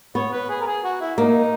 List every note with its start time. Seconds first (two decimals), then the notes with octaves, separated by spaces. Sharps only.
0.15 B3 C#5
0.32 B4
0.49 G#4
0.61 A#4
0.67 G#4
0.84 F#4
1.01 E4
1.18 A#3 D#4